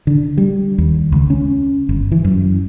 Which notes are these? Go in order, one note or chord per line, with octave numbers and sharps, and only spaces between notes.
D3
G3
D#2
C#2
C#4
G1
E3
F#2